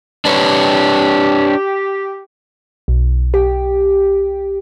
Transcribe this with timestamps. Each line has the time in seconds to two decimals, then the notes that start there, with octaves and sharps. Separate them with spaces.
0.25 D4 G4 B4 C#5
2.88 B1
3.34 G4